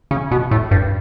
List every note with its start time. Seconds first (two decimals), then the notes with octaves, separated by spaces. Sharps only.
0.11 C#3
0.31 B2
0.51 A2
0.71 G2